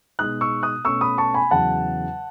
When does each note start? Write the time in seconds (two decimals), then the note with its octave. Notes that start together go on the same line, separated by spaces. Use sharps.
0.19 B2 G#3 D#4 D#6 F#6
0.41 C#6 E6
0.63 D#6 F#6
0.85 B2 A3 C#4 C#6 E6
1.01 B5 D#6
1.18 A5 C#6
1.34 G#5 B5
1.51 E2 C#3 F#3 F#5 A5